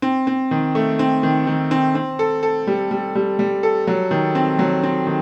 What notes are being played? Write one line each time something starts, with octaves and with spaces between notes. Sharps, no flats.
C4
C4
D#3
A3
C4
D#3
D#3
C4
C4
A4
A4
G3
G3
G3
G3
A4
F#3
D#3
C4
F#3
C4
D#3